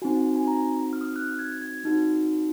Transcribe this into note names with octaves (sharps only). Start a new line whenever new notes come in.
C4 D#4 F#4 G#5
G#5
A#5
F6
D#6
F6
F#6
G#6
G#6
C4 D#4 F#4